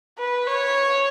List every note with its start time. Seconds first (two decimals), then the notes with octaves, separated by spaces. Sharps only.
0.18 B4
0.47 C#5